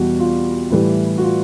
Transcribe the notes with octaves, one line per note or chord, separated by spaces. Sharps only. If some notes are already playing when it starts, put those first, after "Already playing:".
Already playing: E2 B2 G3 F#4 G4
F4
A2 E3 G3
F#4
F4